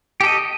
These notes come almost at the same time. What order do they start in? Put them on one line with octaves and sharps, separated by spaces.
G4 A4 D#5